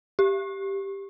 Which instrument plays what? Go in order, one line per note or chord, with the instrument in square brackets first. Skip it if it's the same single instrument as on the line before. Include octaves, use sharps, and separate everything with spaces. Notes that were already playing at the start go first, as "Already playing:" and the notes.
[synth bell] G4